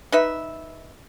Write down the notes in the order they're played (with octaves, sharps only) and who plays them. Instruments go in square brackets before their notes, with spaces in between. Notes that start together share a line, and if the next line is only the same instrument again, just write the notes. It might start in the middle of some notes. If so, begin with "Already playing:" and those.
[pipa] D#4 B4 E5